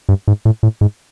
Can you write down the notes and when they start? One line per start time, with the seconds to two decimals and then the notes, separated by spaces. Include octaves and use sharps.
0.09 G2
0.28 G#2
0.45 A2
0.63 A2
0.81 G#2